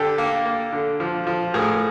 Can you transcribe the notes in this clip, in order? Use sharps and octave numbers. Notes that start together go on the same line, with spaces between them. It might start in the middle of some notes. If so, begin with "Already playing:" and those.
Already playing: D3 G4 A4
A#3
A#3
D3
F3
F3
A2 G#4 A#4